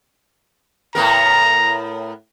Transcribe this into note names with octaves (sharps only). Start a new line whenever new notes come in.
A2 B3 A#4 A#5